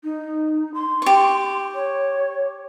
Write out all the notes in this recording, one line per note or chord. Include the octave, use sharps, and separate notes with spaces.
D#4
C6
G4 C#6
C#5